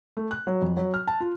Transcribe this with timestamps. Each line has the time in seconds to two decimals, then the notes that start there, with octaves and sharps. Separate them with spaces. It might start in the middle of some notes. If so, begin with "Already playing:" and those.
0.17 A3
0.31 F#6
0.47 F#3
0.62 F2
0.77 F#3
0.94 F6
1.07 A5
1.21 F4